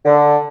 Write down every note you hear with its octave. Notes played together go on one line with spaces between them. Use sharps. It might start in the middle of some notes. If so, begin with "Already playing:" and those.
D3